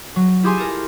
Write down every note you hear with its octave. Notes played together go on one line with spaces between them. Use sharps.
F#3
E4 F4 G4 G#4 G#5 C6
A4 A#4